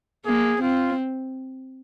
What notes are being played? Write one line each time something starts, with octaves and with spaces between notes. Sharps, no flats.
A#3 G#4
C4 F4